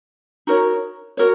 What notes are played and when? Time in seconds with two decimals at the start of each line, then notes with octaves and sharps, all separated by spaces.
0.47 D#4 F#4 A#4 C#5
1.17 F#4 A#4 C#5